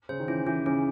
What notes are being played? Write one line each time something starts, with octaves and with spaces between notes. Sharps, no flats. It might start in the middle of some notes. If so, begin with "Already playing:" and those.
C#3 C5
D#3
E3 C#4
E3 C#4
C#3 C#4